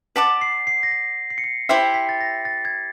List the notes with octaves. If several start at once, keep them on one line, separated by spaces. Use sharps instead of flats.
D5 F#5 A5 D6 B6
C7
C7
A#6
B6
C7
C#7
C7
E4 G4 C5 E5 C7
B6
A6
A#6
A6
G#6